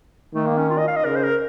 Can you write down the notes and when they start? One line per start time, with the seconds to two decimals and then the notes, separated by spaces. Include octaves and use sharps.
0.34 D#3 A3
0.46 A#3
0.58 C#4
0.70 F4
0.78 D#5
0.88 F5
0.96 D#5
1.05 C#3 A#4
1.15 C5
1.23 A#4